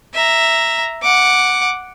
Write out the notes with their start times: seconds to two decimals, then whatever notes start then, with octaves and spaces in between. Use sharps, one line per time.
0.14 E5 A#5
1.03 F#5 D6